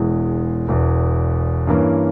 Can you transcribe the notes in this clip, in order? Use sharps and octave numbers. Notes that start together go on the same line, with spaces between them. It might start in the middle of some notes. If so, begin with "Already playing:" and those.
Already playing: E1 E2 E3 G#3
E1 E2 E3
G2 E3 A#3 C#4